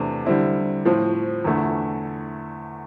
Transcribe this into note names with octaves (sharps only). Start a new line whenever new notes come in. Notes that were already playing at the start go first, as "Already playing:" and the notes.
Already playing: E2 C3 E3 A3 D4
D3 G3 C4 E4
A2 F3 C4
E2 D3 A3 E4